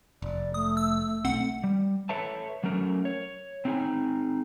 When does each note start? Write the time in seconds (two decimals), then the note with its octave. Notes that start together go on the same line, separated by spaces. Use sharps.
0.22 F1 D5
0.54 A3 D#6
0.77 E6
1.25 B1 A3 C4 F#5
1.64 G3
2.09 A4 B4 C#5 E5 A5
2.63 F#3 A3 C#4 A#4
3.05 C#5
3.65 C4 D4 D#4 G#4 G#5